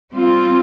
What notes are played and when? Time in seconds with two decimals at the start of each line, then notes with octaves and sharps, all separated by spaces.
0.13 G3 C4 F4